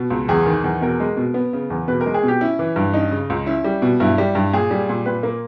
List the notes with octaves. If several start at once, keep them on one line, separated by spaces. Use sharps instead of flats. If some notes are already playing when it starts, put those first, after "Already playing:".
Already playing: B2
C#2
E2 G#4
D#3
E2
B2 A#4
G#3
B2
B3
C#3
E2
B2 B4
A#4
G#3
G#4
B2
G4
C#4 E4
E3
G2
C#4 D#4
C#3
C#2
C#4 E4
G3
B2
G2 E4
G3
G2
A#2 G#4
G3
A#2
A#2 B4
A#3